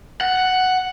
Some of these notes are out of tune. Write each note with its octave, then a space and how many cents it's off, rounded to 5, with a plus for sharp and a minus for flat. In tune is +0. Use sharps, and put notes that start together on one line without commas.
F#5 +5